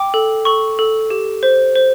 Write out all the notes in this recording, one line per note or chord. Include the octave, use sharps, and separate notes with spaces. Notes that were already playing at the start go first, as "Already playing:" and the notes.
Already playing: G5 D6
A4
A4 C#6
A4
G4
C5
C5